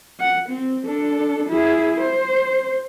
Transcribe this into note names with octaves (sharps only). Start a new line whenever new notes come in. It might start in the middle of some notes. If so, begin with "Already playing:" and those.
F#5
C4
D4 A4
E4 G#4
C5